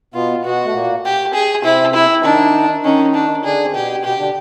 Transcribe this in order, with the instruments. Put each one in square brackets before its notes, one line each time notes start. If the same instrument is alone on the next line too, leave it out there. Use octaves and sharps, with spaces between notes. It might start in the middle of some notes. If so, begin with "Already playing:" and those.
[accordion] B2 B3 [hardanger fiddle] F4
[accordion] B2 B3 [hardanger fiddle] F#4
[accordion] A3
A#2 A#3
[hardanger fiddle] G4
G#4
[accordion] C3 C4 [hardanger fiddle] E4
[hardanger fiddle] E4
[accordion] D#3 D#4 [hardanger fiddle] D4
[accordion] D#3 D#4 [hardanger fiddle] C#4
[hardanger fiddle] D4
[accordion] D3 D4 [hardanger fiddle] G#4
[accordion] C4
[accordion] B2 B3 [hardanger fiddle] G4
[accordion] B2 B3 [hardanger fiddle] G4
[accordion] D3 D4